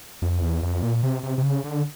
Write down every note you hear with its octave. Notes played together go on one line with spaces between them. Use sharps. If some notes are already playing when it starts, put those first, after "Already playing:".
F2
E2
F2
A#2
C3
C3
C3
C#3
D3